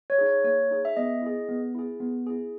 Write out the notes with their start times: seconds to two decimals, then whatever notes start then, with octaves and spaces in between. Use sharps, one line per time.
0.10 C#5
0.18 D#4 G#4
0.26 C#5
0.44 A#3 C#5
0.71 D#4 G#4
0.85 E5
0.97 B3 D#5
1.22 E4 G#4
1.49 B3
1.75 E4 G#4
2.00 B3
2.27 E4 G#4